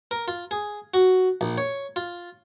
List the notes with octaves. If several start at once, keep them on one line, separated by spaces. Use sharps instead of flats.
A#4
F4
G#4
F#4
A#1
C#5
F4